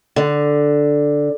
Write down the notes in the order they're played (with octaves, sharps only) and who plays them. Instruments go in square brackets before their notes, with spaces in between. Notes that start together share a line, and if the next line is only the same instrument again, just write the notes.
[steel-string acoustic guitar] D3